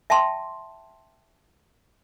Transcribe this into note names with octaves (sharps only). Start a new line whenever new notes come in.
E5 G5 A5 C6